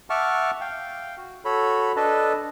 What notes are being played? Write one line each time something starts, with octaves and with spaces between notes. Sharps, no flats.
E5 F#5 A5 C#6 D6 F6
F5 G5
F#4
F#4 A4 C#5 B5
D4 A4 B4 D#5 A5